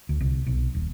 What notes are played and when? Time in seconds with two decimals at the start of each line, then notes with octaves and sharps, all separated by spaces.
0.09 D2
0.21 C2
0.46 B1
0.75 D#1